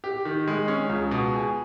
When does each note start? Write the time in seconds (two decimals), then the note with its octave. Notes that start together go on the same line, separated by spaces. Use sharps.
0.04 G4
0.25 D#3
0.47 G#3
0.68 C#4
0.89 C#2
1.11 B2
1.33 G#4